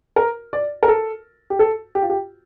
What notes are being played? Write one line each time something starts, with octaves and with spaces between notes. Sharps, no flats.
A#4
D5
A#4
A4
G4
A4
G4
F4
G4